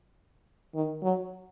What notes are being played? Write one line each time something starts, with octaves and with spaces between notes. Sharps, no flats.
D#3
F#3